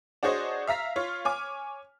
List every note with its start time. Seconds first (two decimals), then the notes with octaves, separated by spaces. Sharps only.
0.23 D4 F#4 G#4 C5 C#5 D#5
0.67 E5 F5 A#5 B6
0.96 F4 C#5
1.25 C#5 G#5 D6 F6